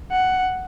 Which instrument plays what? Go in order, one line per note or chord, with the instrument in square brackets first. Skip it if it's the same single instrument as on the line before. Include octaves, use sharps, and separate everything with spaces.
[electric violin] F#5